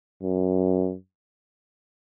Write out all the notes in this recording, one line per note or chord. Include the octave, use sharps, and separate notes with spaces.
F#2